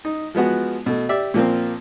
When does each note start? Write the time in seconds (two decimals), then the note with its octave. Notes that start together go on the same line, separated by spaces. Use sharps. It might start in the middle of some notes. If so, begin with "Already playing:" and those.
0.05 D#4
0.35 F3 G#3 B3 F#4
0.86 B2 A3
1.09 G4 D5 E5
1.34 A#2 F3 A#3 C4